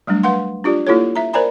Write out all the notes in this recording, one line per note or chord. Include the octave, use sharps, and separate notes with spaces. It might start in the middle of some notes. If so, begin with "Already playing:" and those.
F#3 G3 A3 D4
B4 F5 F#5 C6
D4 F4 G4 D5
A#3 E4 F4 G4 A4 C#5
E5 A#5
A#4 C5 D5 G#5 A#5 B5